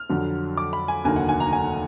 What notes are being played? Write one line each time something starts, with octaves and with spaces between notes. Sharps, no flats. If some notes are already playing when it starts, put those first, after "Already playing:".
Already playing: F6
F2 D3 F#3
D6
B5
G#5
F1 D#2 D3 F#3 A#3 G#5
F#5
G#5
A#5
G#5